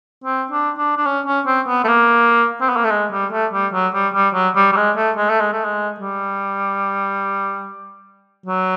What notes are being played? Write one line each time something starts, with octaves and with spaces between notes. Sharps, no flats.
C4
D4
D4
D4
C#4
C#4
C4
B3
A3
A#3
C4
B3
A#3
A3
G#3
G3
A3
G3
F#3
G3
G3
F#3
G3
G3
G#3
A3
G#3
A3
G#3
A3
G#3
G3
F#3